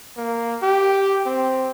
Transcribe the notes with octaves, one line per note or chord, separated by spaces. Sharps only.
A#3
G4
C4